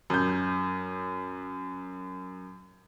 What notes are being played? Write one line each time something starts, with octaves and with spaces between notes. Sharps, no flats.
F#2 G6